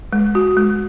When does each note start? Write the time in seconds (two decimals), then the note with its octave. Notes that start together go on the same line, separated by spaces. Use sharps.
0.13 G#3
0.35 F#4
0.57 G#3